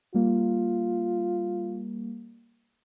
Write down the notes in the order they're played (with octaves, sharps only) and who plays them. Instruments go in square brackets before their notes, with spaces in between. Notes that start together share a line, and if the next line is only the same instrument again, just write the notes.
[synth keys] G3 A#3 [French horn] F4